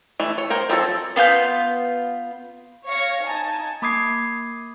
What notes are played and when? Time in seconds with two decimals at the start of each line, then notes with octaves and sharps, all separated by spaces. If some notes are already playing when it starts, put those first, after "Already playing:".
0.20 E3 A3
0.38 C#5
0.50 A#4 C5 G5
0.70 F3 C4 D4 A4 C#5
1.16 B3 F4 G#5 G6
2.86 C#5 F5 C#6 A#6
3.22 D#4 G#5 A5
3.82 A#3 B5 D6 D#6 G#6 C7